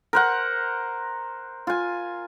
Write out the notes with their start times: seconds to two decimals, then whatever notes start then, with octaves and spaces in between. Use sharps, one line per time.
0.13 A#4 C5 F#5
1.67 F4 G#5